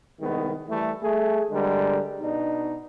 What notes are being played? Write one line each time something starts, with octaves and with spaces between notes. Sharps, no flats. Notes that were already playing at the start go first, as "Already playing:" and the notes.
C2 D#3 G#3 B3
E3 G3 A3
A3 G#4
D3 G3 G#3 A#4
B2 D4 D#4